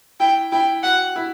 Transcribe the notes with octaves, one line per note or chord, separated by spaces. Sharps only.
E4 G5
E4 G5
F#4 F#5
E4